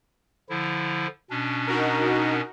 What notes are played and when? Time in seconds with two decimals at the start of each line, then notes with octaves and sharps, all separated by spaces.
0.50 D3 F3 E4
1.30 B2 C#4 D4
1.67 D#4 F#4 A#4